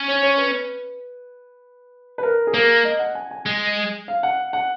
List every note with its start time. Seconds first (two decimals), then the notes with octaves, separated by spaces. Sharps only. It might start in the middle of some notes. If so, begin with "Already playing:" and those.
Already playing: C#4
0.08 C#5
0.23 C#5
0.38 B4
2.18 B4
2.23 A#4
2.47 G#4
2.54 A#3 A#4
2.85 D#5
2.99 F#5
3.15 G#5
3.31 G#5
3.46 G#3
4.08 F5
4.23 F#5
4.53 F#5